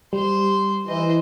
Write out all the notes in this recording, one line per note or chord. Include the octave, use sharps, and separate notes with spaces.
G3 C5 C6
E3 C5 D#5